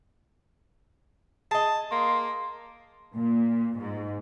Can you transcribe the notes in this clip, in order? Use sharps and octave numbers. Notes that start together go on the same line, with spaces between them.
G#4 D#5 A5
A#3 C6
A#2
G#2